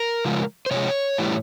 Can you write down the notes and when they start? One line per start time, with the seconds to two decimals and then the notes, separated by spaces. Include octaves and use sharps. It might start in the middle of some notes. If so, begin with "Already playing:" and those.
Already playing: A#4
0.25 C#3 F3 G#3
0.66 C5
0.71 C3 F3 G#3 C#5
1.18 A2 E3 G3